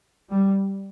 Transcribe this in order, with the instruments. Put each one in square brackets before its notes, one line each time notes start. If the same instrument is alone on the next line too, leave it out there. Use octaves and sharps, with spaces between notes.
[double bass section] G3